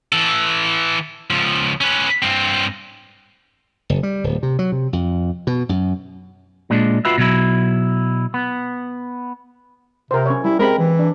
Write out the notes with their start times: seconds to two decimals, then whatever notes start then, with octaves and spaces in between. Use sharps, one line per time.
0.12 E3 A4
1.30 C#2 F3
1.81 C#4 B4
2.22 G2 C4
3.90 F#1
4.03 G3
4.24 D1
4.43 C3
4.59 F#3
4.72 C3
4.93 F2
5.47 B2
5.69 F#2
6.70 A#2 G#3 D4
7.05 F4 F#4 B4 E5
7.18 B2 F#3 E4
8.34 B3
10.11 C3 A#4 C5
10.26 C#4 C#5
10.44 G3 E4
10.59 G#3 C4 A#4 B5
10.79 E3
10.99 D4